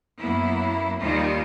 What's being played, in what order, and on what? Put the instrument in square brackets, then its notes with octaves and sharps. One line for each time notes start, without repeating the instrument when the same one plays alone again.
[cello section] F#2 A#3 B3 E4
D#2 D#3 G3 D#4 F4